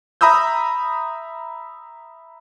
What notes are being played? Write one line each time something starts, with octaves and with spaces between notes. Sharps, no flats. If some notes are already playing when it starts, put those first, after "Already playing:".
E5 A#5 B5 D#6 E6 G6